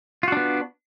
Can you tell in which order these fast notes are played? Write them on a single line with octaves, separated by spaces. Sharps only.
F4 F#4 D4 B3